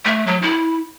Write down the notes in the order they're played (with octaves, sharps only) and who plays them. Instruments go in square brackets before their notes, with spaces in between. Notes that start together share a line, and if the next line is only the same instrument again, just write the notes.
[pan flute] A3
F#3
E4